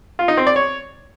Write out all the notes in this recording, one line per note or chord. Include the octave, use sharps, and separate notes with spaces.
F4
D#4
C4
D5
C#5